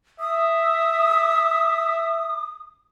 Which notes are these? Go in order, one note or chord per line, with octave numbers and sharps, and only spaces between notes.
E5 D#6